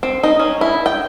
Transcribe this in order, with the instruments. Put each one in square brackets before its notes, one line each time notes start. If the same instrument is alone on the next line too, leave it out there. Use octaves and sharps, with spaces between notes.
[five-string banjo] C4
D#4
C#4
E4
G5